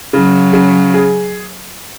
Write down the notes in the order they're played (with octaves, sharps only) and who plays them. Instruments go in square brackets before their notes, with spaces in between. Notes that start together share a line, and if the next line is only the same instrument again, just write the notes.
[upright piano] C#3 [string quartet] F#3
[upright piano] C#3
G#4